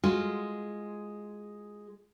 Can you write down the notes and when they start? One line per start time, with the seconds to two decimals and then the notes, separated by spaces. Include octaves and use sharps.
0.04 G#3 F4 F#4